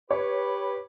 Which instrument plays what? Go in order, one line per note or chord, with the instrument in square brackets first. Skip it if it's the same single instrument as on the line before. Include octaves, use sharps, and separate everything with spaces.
[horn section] G4 B4 [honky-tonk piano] C#5